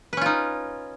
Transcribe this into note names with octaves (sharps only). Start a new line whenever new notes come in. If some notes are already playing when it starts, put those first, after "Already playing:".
C#4 D#4 F4 B4